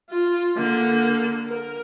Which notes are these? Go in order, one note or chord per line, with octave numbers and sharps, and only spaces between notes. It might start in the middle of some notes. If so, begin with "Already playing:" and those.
F4
D3 A#3
A#4